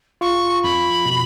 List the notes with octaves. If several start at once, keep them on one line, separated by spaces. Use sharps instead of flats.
F4 C#6
F2 B5
B2